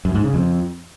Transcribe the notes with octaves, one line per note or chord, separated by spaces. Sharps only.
F#2
G#2
C#3
F2